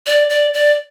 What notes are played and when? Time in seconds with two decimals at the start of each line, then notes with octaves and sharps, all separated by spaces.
0.07 D5
0.30 D5
0.54 D5